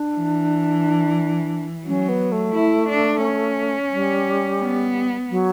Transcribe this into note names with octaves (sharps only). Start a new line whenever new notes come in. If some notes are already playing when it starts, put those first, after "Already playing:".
Already playing: D4
E3
F#3 C#4
B3
A3
E4
D4
C#4
G3
B3
F#3